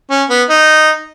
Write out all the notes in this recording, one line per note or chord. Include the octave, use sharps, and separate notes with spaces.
C#4
B3
D#4